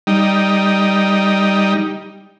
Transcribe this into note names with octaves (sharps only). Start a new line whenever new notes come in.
G3 D#4